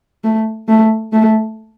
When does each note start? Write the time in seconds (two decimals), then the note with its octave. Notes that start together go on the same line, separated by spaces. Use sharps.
0.24 A3
0.69 A3
1.13 A3